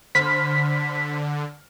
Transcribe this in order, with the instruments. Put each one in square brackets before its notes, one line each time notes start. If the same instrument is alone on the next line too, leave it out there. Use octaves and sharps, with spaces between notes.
[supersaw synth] D3 [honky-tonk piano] C5 B5 F6 [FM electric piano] B6